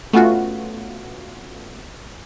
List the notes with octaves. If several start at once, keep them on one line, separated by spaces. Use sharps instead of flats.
A3 B3 C#4 F4 F#4